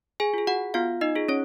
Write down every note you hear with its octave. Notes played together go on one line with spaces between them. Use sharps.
G#4 G#5
F4 G#4
F#4 F#5
B3 F4 F5
D#4 D#5
F4 G#4
C#4 C#5